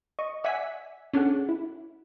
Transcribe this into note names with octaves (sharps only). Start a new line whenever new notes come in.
D#5 C#6
D5 E5 F#5 G#5 B6
C#4 D4 G#4 A4 F#5
E4